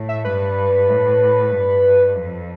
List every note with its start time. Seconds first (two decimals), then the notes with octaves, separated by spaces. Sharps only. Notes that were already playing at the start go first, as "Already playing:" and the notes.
Already playing: A2
0.09 E5
0.25 G2 B4
0.89 A2
1.51 G2
2.16 F2